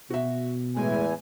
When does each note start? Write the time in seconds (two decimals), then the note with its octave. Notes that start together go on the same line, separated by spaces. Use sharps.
0.10 B2 F#4 E5
0.77 E2 A2 E3 G#3 G#5